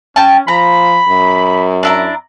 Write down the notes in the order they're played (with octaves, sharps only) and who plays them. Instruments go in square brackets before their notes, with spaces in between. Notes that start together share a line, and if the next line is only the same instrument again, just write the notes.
[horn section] C#4 [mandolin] G5 A5
[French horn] F3 [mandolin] A#5 [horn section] B5
[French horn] F#2
[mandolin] D4 E4 A#5